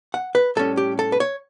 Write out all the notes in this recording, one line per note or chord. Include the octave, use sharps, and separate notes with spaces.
F#5
B4
A2 G3 C#4 A4
G4
A4
B4
C#5